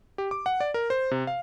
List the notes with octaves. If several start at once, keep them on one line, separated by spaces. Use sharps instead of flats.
G4
D6
F#5
D5
A#4
C5
C3
F5